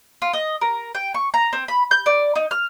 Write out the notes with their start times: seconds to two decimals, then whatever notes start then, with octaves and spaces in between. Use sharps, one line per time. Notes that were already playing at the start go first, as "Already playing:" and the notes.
0.22 F4
0.33 D#5
0.61 A#4
0.95 G5
1.14 C#6
1.34 A#5
1.53 C4
1.68 B5
1.91 G6
2.06 D5
2.36 D#4
2.51 F6